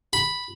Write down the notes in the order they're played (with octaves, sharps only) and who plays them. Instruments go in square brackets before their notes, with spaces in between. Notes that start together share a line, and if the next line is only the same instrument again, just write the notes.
[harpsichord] B5